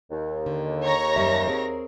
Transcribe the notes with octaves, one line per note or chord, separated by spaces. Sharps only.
D#2
D3
C#5 A#5 A#6
F#2 G3 E5
C4 G#4 A#4